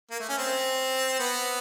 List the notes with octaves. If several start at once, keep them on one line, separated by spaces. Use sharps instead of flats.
A#3
A3
C#4
C4
B3